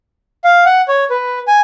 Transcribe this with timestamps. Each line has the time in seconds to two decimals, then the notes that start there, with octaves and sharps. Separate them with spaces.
0.44 F5
0.65 F#5
0.88 C#5
1.10 B4
1.48 G#5